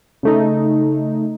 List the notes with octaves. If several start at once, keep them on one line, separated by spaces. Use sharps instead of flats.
C#3 A3 D#4